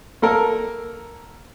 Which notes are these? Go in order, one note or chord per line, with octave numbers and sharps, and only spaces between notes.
A#3 A4 A#4